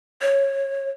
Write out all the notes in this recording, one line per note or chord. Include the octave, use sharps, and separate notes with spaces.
C#5